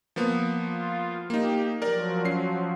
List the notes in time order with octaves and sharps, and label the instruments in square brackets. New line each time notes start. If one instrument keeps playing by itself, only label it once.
[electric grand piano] F3 A#3 B3
[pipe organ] F4
[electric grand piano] A#3 D#4 [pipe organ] G4
[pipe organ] F3 F#3 [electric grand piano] A#4 D5
[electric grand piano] C#4 C7